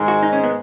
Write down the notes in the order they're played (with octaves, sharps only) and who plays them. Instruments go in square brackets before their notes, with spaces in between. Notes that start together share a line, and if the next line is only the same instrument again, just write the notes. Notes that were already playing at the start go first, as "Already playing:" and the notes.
Already playing: [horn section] G#2 D#3 G#3
[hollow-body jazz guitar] F#4
D#4
C#4
B3